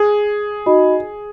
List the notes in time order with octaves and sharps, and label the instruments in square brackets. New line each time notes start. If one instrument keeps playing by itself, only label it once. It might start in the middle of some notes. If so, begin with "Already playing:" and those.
Already playing: [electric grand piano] G#4
[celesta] D#4 F#4 D#5 B5